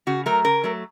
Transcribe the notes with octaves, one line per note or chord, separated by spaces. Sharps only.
C#3 F#4
F#3 A3 A#4
C#3 A#4
F#3 A3